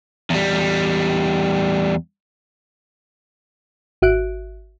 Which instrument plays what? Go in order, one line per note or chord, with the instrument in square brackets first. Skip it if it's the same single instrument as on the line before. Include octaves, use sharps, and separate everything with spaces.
[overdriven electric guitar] E2 G3
[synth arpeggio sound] G#1 F#4 E5 F#6 D7